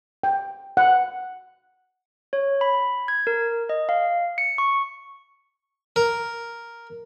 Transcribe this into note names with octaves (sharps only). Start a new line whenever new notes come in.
G5
F#5
C#5
B5
G#6
A#4
D#5
F5
C#7
C#6
A#4